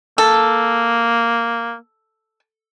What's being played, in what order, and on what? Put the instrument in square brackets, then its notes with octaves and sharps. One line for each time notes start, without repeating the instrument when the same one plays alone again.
[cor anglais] A#3 [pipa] A4